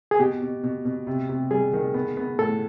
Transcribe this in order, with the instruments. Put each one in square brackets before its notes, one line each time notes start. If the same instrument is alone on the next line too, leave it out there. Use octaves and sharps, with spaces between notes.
[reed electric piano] G#4
[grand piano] B2 [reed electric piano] G4
[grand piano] B2
B2
B2
C3
C3
[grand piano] G3 [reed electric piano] G#4
[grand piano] D#3
B3
B3
[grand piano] A2 [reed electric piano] A4